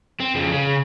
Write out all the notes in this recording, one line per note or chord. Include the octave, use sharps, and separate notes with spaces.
C4
F2 C#3
C#3